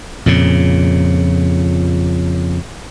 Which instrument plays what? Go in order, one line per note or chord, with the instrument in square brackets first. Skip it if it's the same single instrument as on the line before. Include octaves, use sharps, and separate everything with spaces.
[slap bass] F2 A#2 C#3